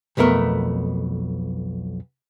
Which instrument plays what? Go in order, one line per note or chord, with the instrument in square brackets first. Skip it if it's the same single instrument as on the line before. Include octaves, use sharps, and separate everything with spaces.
[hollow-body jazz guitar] B1 F2 A3 B3 A#4